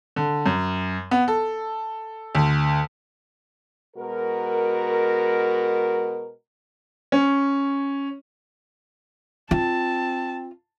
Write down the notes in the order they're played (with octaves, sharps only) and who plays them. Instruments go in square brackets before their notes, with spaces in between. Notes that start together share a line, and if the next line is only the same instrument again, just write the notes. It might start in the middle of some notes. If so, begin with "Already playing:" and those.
[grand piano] D3
F#2
B3
A4
D2
[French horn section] B2 G#3 F#4 A#4
[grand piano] C#4
[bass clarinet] C4 [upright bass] F4 [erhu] A5